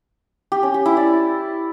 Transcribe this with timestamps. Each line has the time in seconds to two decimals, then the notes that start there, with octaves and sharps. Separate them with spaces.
0.52 G4
0.63 C#4
0.74 G4
0.86 E4
0.97 D5